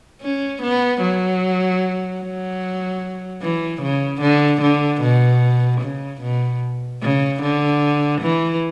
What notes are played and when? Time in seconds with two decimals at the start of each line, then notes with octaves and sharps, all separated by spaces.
0.21 C#4
0.62 B3
1.01 F#3
2.22 F#3
3.42 E3
3.82 C#3
4.21 D3
4.62 D3
5.02 B2
5.81 C#3
6.22 B2
7.02 C#3
7.42 D3
8.22 E3